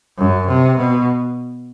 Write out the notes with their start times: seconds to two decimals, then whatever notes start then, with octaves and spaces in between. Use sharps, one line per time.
0.17 F#2
0.47 C3
0.77 B2